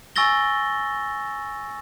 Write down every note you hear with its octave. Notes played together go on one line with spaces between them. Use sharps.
G#5 C#6 E6 A6 A#6 G7